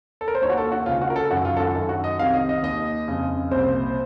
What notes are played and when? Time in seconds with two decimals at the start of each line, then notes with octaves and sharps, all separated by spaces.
0.21 A4
0.28 A#4
0.35 C5
0.42 D#2 D#3 C#5
0.50 F#4
0.58 A4
0.72 F#4
0.86 C#2 C#3 F4
1.01 F#4
1.10 A#4
1.16 A4
1.31 F#2 D#3 F#4
1.45 F4
1.57 A4
1.60 F#4
1.74 F#2 D#3 A4
1.89 F#4
2.04 D#5
2.19 C2 C3 D#3 F5
2.34 D#5
2.49 D#5
2.63 D#2 D#3 D#5
3.08 F2 C#3
3.51 C2 A#2 C5